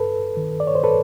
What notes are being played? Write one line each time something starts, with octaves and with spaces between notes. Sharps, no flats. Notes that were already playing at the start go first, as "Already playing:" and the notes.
Already playing: G2 A4 B4
D#3
D5
C#5
C5
A4 B4